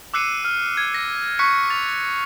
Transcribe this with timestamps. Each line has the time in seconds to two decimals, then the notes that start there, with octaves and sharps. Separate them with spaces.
0.14 D6 E6 F#6 C7 C#7 D#7
0.44 F6
0.77 G#6
0.94 A#6
1.39 C#6 F#6 B6 C#7
1.70 A6 F7